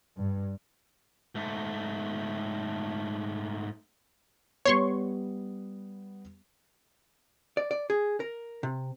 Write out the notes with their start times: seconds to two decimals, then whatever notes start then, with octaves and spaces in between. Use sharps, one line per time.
0.18 G2
1.35 G#2 A3
4.65 G3 B3 C#5 C6 C#6
7.57 D5
7.71 D5
7.90 G#4
8.20 A#4
8.63 C3